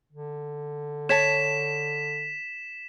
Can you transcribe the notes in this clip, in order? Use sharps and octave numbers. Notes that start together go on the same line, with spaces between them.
D3
C#5 A5 B6 E7